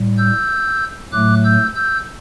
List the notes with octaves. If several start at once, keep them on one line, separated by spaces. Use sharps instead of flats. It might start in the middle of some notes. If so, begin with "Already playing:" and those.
Already playing: A2 G3
E6 G6
A2 F#3 A3 D6 F#6
E6 G6
E6 G6